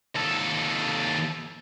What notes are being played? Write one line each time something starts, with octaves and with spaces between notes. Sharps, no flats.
D#2 A4